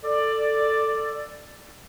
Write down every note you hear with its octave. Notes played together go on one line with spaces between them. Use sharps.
A4 D5